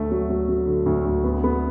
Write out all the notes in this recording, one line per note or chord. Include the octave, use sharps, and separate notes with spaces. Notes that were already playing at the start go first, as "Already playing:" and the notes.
Already playing: D2 A3
F#3
F#3
F#3
D3
D2
D2
B3
B3